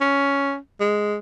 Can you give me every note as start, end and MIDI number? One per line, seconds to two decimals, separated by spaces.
0.01 0.56 61
0.80 1.17 56